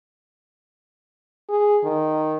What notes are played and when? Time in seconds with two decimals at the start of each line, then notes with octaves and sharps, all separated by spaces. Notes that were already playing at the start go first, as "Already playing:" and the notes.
1.49 G#4
1.84 D#3